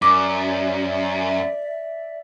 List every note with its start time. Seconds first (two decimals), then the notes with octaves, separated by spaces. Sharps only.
0.02 F#2 D5 E5 D6